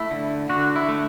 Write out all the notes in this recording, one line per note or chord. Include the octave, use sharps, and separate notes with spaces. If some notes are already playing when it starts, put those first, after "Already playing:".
Already playing: A3 E4
D3
D3 F#4
E4
A3